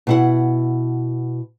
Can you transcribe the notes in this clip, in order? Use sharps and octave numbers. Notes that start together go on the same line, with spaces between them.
B2 E4 F#5